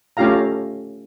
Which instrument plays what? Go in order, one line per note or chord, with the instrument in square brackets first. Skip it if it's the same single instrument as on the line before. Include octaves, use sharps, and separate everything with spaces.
[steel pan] A3 C#4 F4 G4 F5 A#5